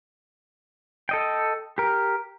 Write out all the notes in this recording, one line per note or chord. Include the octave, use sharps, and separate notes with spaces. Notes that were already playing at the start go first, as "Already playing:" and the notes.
A4 D#5 G5
G4 A#4